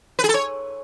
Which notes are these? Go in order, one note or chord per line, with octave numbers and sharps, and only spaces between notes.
B4
G#4
A4
C#5